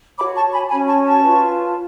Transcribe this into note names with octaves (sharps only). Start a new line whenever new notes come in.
F#4 C#5 B5 D6
A5 C#6
G#5 B5
C#4 F#4 C#5 G#5 B5
A5 C#6
A5 C#6
F4 B4